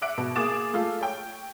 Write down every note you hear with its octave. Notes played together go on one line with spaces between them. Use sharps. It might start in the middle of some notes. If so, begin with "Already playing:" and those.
E5 F#5 D6 F#6 D7
B2
A#3 G#4 D6 D#6 A6 E7
A3 F4 A4 F5
C#5 G5